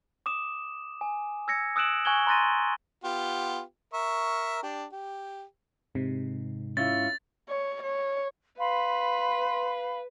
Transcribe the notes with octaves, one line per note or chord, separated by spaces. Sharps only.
D6 D#6 E7
G#5
E6 G#6 A#6 C#7
D#6 E6 F#6 D7 E7 F#7
G#5 C#6 F#6 G#6 F#7 G7
A#5 C6 F#6 A6 A#6 D#7
B3 F4 G4
A#4 E5 C#6
D4 G4
G4
G#2 C3
C#4 E4 F4 A6
C#5
C#5
B4 F5 B5 C6